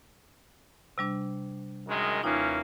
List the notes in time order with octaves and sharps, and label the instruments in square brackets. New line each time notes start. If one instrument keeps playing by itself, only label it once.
[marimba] C3 G3 D4
[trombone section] F#2 D#3 G#3
[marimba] D#2 D#4 F4 [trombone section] E3 A#3 C#4